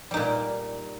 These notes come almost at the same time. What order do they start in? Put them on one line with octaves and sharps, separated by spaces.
G3 D#4 A#2